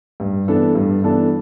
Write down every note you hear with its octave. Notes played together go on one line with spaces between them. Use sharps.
G2
E3 B3 D4 A4
G2
E3 B3 D4 A4